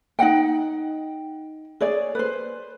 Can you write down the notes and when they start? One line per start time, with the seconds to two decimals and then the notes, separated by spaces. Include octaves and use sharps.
0.19 D#4 D#5 F#5 G5
1.81 G#4 C#5 D5
2.15 B4 C5